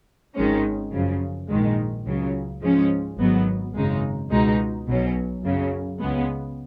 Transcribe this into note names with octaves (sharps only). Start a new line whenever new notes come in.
G#1 G#2 D#3 G#3 C#4
F#2 C#3 F3
A#1 G#2 D#3 G#3
C#2 C#3 F#3
G#2 F3 G#3 C#4
G#1 G#2 F#3 B3
G#1 F#2 C#3 G#3 D#4
C#2 B2 G#3 D#4
B1 B2 F#3 C#4
F#2 C#3 F#3
C#2 C#3 G#3 B3